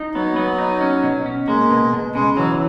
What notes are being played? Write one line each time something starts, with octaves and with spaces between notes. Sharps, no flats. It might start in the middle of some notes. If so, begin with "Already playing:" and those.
Already playing: D#4
F#3 B3
B3
D#4
C#4
B2
C#4
G#3 A#3
B2
B2
C#3 G#3
E3 F#3